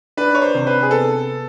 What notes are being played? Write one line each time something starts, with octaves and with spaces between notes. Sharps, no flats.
D4 B4
C#5
C5
C3 C5
B4
G#4
B3 A4